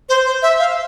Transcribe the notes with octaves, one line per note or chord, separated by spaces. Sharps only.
C5
C5
E5
F5